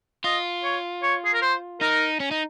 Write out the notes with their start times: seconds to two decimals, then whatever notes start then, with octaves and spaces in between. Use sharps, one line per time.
0.24 F4 D#5
0.64 C#5
1.02 C#5
1.25 G#4
1.34 A#4
1.42 C5
1.81 D#4 A#4
2.20 C#4
2.31 D#4